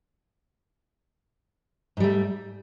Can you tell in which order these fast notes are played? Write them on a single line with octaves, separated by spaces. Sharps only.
G#2 G3 A3